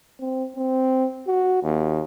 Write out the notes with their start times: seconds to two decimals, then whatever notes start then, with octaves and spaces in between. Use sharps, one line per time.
0.20 C4
0.56 C4
1.27 F#4
1.63 D#2